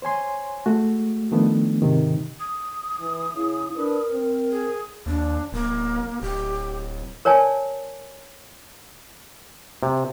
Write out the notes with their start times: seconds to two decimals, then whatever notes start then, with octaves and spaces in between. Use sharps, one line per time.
0.02 C5 C#5 G#5 C6
0.66 G#3 A3 F#4
1.32 D#3 F3 A3 B3 D4
1.82 G#2 C3 D#3
2.40 D#6
2.99 E3
3.35 C#3 E4
3.76 D4 A#4 B4
4.11 C4
4.51 G#4
5.06 D#2 D4
5.53 D1 A#3
6.22 D1 G4
7.25 A#4 C#5 D5 G#5 A5
9.83 C3